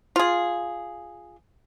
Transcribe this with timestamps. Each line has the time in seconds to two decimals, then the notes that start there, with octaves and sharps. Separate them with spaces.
0.16 F4 G#4